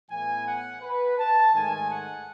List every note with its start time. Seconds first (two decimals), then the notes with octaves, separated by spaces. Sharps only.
0.10 A2 E3 B3 G#5
0.47 F#5
0.82 B4
1.18 A5
1.54 G#2 D#3 A3 G#5
1.89 F#5